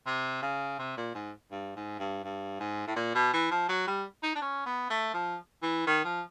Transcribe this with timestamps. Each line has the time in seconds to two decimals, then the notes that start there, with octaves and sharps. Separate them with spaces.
0.06 C3
0.42 C#3
0.79 C3
0.97 A#2
1.15 G#2
1.51 G2
1.76 G#2
1.99 G2
2.24 G2
2.60 G#2
2.87 A2
2.96 A#2
3.15 B2
3.33 E3
3.51 F3
3.69 F#3
3.87 G3
4.23 D#4
4.35 D4
4.41 C#4
4.66 B3
4.90 A3
5.14 F3
5.62 E3
5.87 D#3
6.04 F3